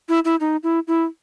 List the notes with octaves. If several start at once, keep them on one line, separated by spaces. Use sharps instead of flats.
E4
E4
D#4
E4
E4